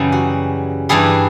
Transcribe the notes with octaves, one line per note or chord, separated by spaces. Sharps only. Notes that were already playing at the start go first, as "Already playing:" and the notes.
Already playing: F#2 C#3 E3 G3
F#4
G2 E3 G3 G#4